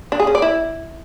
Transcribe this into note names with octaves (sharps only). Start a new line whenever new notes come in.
D4
G#4
C#4
D5
E4